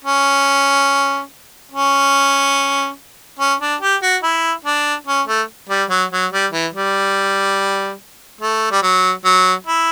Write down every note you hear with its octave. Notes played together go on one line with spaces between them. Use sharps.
C#4
C#4
C#4
D4
G4
F#4
E4
D4
C#4
A3
G3
F#3
F#3
G3
E3
G3
A3
G3
F#3
F#3
E4